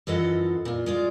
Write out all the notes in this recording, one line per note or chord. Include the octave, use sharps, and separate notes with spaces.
F#2 E3 F4 A4 D#5 F#5
A#2 F4
G#3 F4 D5